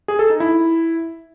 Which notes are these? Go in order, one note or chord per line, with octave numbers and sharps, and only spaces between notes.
G#4
A4
D#4
E4